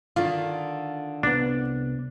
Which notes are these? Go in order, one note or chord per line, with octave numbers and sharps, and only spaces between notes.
D3 D#3 F4
C2 B3 D4